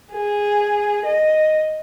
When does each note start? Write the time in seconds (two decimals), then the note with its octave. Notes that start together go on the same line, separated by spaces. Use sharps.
0.12 G#4
1.05 D#5